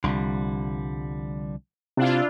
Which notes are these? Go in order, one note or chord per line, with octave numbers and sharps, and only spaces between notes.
C2 D3 F3 G3
C3 D4 E4 F4